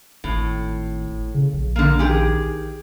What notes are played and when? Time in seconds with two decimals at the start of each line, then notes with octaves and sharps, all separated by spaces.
0.24 G#1 A2
1.34 C#3
1.53 A#1
1.76 D3 A#3
1.99 D#3 G4 G#4